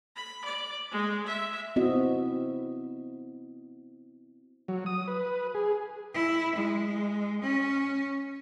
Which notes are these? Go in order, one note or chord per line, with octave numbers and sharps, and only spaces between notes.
B5
D5
G#3
E5
B3 C4 E4 F#4 D#5
F#3
D#6
B4
G#4
E4
G#3
C#4